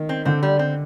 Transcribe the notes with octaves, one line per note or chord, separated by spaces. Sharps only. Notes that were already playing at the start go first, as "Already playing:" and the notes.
Already playing: D#3
C4
D3 C4
G3
C4